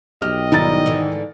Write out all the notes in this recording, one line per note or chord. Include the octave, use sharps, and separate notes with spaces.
B1 G4 D#5 F6
G#2 D#3 G3 E4 A#5 A6
G#2 D3 E3